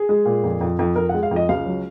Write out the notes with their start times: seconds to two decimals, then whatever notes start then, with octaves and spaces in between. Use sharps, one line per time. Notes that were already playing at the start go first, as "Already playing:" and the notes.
Already playing: G#4
0.09 G#3
0.25 A#2
0.44 F2
0.61 F2
0.79 F2
0.96 F2 A#4
1.09 F#5
1.14 G#3
1.23 F5
1.31 F2
1.36 D#5
1.49 C#2 F5
1.66 F#3